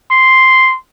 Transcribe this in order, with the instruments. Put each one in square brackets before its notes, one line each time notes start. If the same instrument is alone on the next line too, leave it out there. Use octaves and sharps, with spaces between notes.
[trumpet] C6